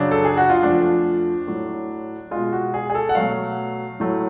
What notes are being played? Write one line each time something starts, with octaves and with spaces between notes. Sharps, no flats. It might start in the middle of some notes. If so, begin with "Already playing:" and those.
Already playing: F#2 C#3 F#3 D4
A4
G#4
F#4
F4
F2 F3 A3 D4
A2 F#3 A3
B2 G#3 F4
F#4
G#4
G#4
A4
F#5
B2 F#3 A3 F5
A2 F#3 A3